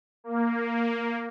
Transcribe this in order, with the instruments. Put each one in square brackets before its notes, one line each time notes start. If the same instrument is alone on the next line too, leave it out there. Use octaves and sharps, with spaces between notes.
[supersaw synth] A#3